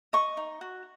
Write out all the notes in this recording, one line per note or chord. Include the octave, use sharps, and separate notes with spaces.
D#5 C#6
D#4
F#4